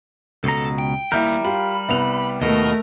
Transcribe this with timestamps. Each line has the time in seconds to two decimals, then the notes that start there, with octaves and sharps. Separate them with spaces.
0.44 C#2 B2 A4 A#5
0.79 G5
1.12 D#2 G3 A#3 E4 A#4 G6
1.45 F4 G4 B5
1.88 C2 B3 F7
2.42 D#2 B2 A3 A#4 D#5